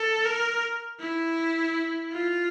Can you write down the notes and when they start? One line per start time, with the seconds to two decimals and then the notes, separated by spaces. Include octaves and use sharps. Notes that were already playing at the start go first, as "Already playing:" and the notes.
Already playing: A4
0.26 A#4
1.00 E4
2.12 F4